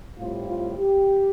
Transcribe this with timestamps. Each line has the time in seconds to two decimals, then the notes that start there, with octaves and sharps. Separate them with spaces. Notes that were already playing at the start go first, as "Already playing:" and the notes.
0.17 A2 G3 C4 F4
0.46 F4
0.75 G4